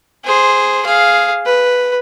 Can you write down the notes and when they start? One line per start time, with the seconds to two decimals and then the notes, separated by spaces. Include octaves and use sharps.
0.24 G#4 C5
0.85 G#4 F5
1.46 B4